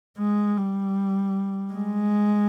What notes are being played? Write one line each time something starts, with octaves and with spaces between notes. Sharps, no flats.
G#3
G3
G#3